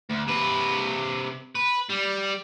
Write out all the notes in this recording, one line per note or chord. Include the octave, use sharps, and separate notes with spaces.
D2
C3 B4
B4
G3